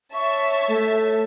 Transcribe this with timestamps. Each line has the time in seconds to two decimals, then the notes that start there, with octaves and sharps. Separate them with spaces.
0.14 C#5 E5 A5 C#6
0.68 A3